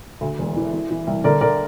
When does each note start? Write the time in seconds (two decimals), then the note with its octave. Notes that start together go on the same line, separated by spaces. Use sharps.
0.21 D2
0.39 E1
0.56 E3
0.73 E3
0.90 E3
1.07 C2
1.24 D3 A#4 D5
1.41 D3 A#4 D5